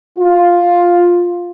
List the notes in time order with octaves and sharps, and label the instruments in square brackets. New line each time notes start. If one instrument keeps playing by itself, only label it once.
[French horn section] F4